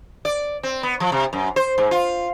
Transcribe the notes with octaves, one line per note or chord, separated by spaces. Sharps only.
D5
C4
B3
F3
C3
F#2
C5
G#2
F4